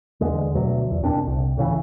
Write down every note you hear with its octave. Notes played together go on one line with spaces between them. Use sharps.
E2 D3 G#3
D2 B2 F#3
E2
F1 A#2 C4 D4
C2
A2 C#3 E3